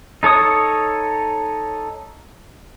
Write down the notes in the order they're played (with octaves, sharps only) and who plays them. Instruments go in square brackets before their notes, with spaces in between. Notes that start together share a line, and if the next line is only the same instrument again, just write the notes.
[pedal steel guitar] D#4 A4 C#5 D#6